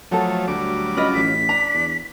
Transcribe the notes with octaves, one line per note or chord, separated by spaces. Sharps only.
F3 F#3 A3 F#4 A4
D2 F#3 G3 D6
C#4 F4 D#5 B5
A1 B6
D4 A#5
E2